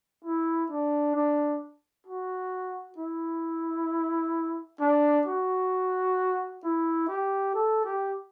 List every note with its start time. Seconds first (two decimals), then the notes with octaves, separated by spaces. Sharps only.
0.25 E4
0.71 D4
1.16 D4
2.07 F#4
2.98 E4
4.80 D4
5.27 F#4
6.64 E4
7.09 G4
7.55 A4
7.85 G4